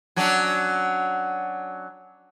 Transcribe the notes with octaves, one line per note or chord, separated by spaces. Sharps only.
F#3 C#4 D4